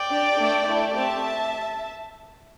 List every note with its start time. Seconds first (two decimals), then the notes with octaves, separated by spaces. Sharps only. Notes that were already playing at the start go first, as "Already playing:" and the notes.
Already playing: D5 G5
0.09 D4 G4
0.38 A3 D4 A4
0.67 A3 E4 A4
0.95 A3 C4 G4 E5 A5